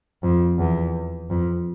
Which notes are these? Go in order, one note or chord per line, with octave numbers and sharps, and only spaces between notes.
F2
E2
F2